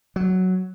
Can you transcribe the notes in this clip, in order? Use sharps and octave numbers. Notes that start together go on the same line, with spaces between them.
F#3